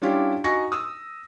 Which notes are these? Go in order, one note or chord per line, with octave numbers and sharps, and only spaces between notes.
G3 C#4 D4 E4 F4 G4
D#4 F#4 G#5 C#6 A#6
D#6 E6